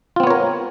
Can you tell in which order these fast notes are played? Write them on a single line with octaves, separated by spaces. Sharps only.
F4 C4 B3 C#5 A#4